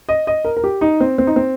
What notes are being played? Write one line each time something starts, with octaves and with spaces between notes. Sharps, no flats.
D#5
D#5
A#4
A#4
G4
D#4
C4
C4
D#4
C4